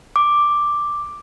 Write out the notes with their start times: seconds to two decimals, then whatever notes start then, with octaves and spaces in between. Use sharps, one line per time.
0.16 D6